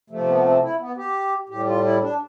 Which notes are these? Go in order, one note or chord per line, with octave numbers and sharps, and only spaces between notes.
C3 F3 A3
B3
C4
E4
B3
G4
A2 G4
G3
F4
E4
D4